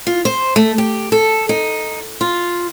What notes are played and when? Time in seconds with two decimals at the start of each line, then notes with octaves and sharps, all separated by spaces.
0.07 F4
0.25 C5
0.56 A3
0.78 G4
1.12 A4
1.49 D#4
2.21 F4